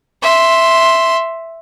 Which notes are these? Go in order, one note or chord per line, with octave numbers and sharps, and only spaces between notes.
E5 C6